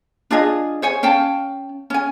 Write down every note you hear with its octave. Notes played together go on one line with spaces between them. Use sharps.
D4 F4 G#4 D#5
C5 C#5 G#5
C#4 F5 G5 A5
C#4 G#5